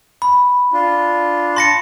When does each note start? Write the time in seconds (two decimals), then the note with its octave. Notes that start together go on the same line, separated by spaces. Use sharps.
0.22 B5
0.73 D4 F4
1.56 A5 C6 A#6 C#7